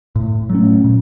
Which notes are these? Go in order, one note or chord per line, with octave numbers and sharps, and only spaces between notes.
A2
F#3 A3 C#4
A#2